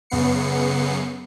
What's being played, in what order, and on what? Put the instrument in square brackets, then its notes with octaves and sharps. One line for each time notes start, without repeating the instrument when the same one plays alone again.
[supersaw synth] F#2 C#3 B3 C7 C#7